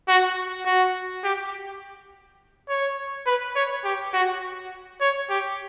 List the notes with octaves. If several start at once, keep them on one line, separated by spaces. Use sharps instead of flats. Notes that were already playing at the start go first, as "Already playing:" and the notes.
F#4
F#4
G4
C#5
B4
C#5
G4
F#4
C#5
G4